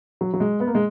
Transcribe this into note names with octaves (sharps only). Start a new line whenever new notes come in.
F#3
F#3
G#3
B3
A#3
G#3